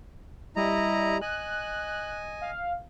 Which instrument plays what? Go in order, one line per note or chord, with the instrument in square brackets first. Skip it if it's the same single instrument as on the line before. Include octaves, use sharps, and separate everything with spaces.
[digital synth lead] G3 [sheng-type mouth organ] E4 D#5 A#5
[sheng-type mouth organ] D#5 G#5 [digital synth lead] F#6
[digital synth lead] F5